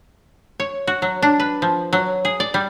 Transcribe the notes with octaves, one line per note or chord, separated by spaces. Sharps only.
C#5
F#4
F#3
D4
B4
F3
F#3
G#4
D5
G3